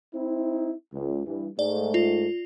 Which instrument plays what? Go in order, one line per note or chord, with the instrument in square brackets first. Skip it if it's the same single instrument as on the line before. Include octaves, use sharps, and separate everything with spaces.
[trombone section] C4 D#4 E4
C#2
G2 E3
[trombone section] G#2 A3 [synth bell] D5
[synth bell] F4